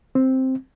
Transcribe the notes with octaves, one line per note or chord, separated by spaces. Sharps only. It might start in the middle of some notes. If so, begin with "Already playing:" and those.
C4